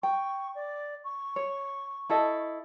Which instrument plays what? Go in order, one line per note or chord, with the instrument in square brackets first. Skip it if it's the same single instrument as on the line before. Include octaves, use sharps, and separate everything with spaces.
[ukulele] G5 [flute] C#6
[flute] D5
C#6
[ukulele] C#5
E4 A4 D#5